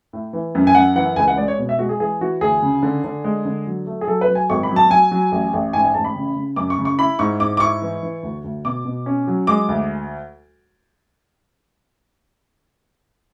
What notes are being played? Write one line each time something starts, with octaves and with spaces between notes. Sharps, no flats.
A2
E3
F#2
G#5
F#2 F#5
E3 F#5
C#2 G#5
F#5
G#3 D5
C#5
B2
E5
G#3 F#4
G#4
E3 G#4
E3 F#4
D2 G#4
C#3
D3
D3
G#3
D3
F#3
A3
G#4
F#3 A4
B4
F#3
G#5
G#1 C#6
B5
F#3
A5
F#3 G#5
F#3
A1
A1
G#2 G#5
G#5
A1 A5
B5
C#3
C#3
F#2 D6
C#6
C#3
C#6
E4 B5
G#2 C#6
G#2 D6
D6
E4 C#6
E3
E3
D2
D2
B2 D6
B2
C#4
F#3
G#3 D6
D2